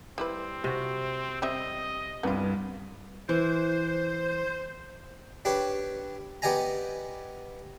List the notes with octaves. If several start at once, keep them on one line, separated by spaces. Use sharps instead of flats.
G3 C4 E4 B4
C3 F#4
G3 C4 D#5 E5
C2 G2 B3 F4
E3 C5
D4 G4 B4 C#5
B3 G4 D5 D#5 G#5 A#5